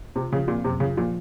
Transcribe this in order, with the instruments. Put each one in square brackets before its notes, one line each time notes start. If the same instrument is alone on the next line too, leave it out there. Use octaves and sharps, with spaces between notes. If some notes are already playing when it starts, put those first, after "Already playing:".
[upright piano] C3 [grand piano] F4
[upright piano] C#3 [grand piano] F3
[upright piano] A#2 [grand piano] C4
[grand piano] F#2 [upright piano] C3
[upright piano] C#3 [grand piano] F4
[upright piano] A#2 [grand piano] F3